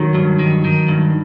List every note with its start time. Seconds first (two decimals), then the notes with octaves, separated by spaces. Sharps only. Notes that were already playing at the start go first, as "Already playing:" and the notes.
Already playing: D#3 F#3
0.14 G2
0.39 D#3
0.65 D#3
0.88 G2